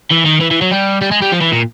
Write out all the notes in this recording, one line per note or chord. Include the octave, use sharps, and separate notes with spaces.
E3
D#3
E3
E3
F#3
G3
G3
G#3
G3
F3
E3
A#2